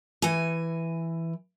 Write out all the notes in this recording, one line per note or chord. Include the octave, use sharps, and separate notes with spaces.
E3 G#5